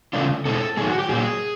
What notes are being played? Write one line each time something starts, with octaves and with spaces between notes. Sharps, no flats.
C#3 E3 A3 D4 F4
B2 G#3 C4 E4 A4
D#3 F#3 A3 G#4
F#4
G4
A#2 F#3 A#3 G#4